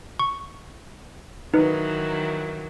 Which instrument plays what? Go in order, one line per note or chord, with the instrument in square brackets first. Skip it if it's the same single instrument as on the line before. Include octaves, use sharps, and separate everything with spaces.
[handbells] C#6
[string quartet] D#3 E3 F#3 [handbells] D#4 B4